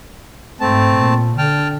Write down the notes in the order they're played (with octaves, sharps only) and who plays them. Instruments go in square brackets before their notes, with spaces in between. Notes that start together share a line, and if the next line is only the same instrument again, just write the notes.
[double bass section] G#2 [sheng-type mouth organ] A3 C4 A5
[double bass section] A#2
[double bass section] D3 [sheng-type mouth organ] G5 A5 F6